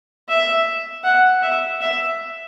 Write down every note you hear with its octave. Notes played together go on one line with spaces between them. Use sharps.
E5
F#5
E5
E5